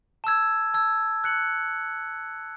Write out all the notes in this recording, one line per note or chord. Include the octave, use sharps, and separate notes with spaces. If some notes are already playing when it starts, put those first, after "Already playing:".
A5 E6 G#6
A5 E6 G#6
F#6 C#7 F#7